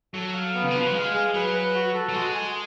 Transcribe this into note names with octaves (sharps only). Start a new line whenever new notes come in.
F#3 A4
F5
B3
C#3
D3
F3 B4
F#3
G#3 F5
G#4
F#3 B4
B4
F#4
A4
F#3
G#3 F#4
G#5